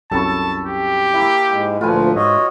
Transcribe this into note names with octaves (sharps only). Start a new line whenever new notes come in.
C2 F#2 A4 A5 B5 C#6
G4
A#3 E4
G#2 G#3 G#5
D2 A#2 F3 A3 F4 F#4 B4 G#5
G#2 F#4 C#5 D#5 E5